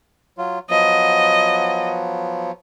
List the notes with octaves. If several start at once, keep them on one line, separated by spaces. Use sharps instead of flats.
F#3 F4
F3 F#3 B3 D#5